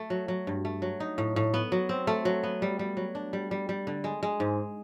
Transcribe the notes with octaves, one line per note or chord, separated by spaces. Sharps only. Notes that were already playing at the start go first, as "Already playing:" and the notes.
Already playing: A3
F#3
F#3
G2
A3
F#3
D#4
A2
A2
B3
F#3
C4
A3
F#3
B3
G3
G3
F#3
D4
G3
G3
G3
D3
G#3
G#3
G#2